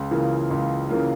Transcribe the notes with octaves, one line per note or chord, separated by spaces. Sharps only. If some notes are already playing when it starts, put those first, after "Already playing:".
Already playing: C#2
C#3 E3 A#3 F4
C#2
C#3 E3 A#3 F4